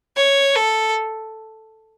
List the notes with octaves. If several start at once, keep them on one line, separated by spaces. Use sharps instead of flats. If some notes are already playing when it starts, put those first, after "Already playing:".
C#5
A4